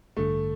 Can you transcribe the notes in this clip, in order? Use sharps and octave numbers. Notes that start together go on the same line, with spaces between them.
A1 G2 D3 A3